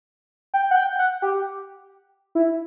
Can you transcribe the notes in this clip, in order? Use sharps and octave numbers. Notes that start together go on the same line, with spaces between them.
G5
F#5
G5
F#5
G4
E4